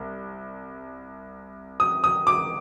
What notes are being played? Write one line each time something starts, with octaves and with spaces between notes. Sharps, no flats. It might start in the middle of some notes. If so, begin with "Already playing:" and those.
Already playing: C2
D#6
D#6
D6